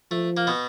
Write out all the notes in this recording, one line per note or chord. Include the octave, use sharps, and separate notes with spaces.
F3 A3
A#3
B2 B3